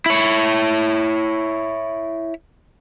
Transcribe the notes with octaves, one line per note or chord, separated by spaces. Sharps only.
E4 C#5